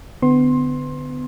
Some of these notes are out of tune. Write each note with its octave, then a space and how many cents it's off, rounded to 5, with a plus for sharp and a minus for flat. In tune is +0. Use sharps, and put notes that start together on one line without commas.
D3 +0 B3 +30 C6 +20